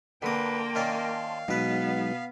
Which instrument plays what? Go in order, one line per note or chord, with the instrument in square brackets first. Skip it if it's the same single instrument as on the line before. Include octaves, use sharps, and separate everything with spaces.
[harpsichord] D3 D#6 [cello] A#3 G5 [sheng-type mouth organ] B4 [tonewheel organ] A5 C6
[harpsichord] D#3 C#4 D5 [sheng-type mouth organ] F5
[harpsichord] B2 B4 [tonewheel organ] F#3 G#3 D#4 [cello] B3